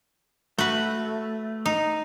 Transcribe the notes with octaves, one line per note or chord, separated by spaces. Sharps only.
A3 F#4 B4
D#4